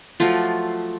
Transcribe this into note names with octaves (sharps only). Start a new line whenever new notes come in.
F3 F#3 A3 F4